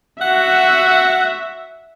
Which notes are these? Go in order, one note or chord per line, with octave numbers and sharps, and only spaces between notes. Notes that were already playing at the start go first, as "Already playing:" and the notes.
F#4 E5 F#5